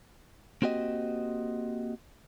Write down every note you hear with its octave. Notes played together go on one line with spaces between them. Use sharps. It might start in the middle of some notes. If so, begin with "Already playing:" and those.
A#3 C4 F#4 G4 D#5